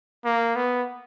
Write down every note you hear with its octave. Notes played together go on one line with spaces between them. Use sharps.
A#3
B3